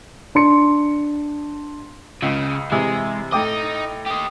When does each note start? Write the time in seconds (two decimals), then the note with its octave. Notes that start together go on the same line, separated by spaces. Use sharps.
0.35 D4 C6 C#7
2.22 C#2 C#3
2.72 C3 E3 G#3 E4
3.32 A2 D#4 D#5 G5 D6
4.07 G4 D#5